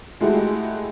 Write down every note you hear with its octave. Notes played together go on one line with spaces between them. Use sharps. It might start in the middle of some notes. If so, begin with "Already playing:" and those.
G#3 A3 E4 F#4 G4